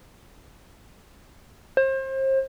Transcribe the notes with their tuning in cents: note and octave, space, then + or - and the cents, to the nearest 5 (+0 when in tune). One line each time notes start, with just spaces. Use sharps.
C5 +35